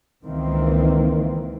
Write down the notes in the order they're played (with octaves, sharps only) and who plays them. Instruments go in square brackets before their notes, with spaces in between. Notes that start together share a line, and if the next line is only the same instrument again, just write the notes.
[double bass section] C#2 D#3 E3 A#3 C4